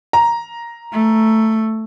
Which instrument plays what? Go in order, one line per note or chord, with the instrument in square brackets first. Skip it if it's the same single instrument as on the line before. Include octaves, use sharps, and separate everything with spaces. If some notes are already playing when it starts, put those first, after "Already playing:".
[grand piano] A#5
[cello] A3